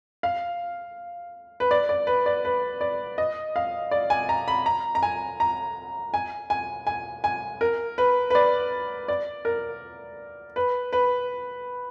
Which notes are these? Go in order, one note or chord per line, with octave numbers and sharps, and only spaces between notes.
F5
B4
D5
D5
B4
D5
B4
D5
D#5
F5
D5
G#5
A#5
B5
A#5
A#5
G#5
A#5
G#5
G#5
G#5
G#5
A#4
B4
B4
D5
D5
A#4
B4
B4